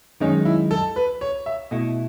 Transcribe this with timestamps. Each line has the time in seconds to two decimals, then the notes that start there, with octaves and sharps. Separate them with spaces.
0.20 F#2 D#3 G#3 C#4 D#4
0.45 E4
0.71 A4
0.96 B4
1.21 C#5
1.46 E5
1.71 B2 A3 E4 D#5